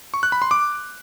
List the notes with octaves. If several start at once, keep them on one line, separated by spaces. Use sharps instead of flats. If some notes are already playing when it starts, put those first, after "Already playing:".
C#6
F#6
B5
C6
D6